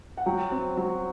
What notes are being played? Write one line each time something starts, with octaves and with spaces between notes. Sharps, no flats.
F#5
F#3 G5
C4
F#3